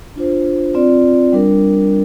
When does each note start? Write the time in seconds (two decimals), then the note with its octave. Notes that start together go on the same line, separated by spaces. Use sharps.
0.16 D4 F4 C5
0.74 C4 F4 D5
1.33 G3 D4 A#4